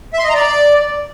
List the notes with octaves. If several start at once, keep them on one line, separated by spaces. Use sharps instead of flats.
E5
C6
D#5
A#5
D5